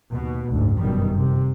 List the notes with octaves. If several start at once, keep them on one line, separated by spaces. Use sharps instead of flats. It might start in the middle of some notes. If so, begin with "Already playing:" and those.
D#2 B2
F#1 D2 G#2
G1 F#2 B2 D#3 G3
C3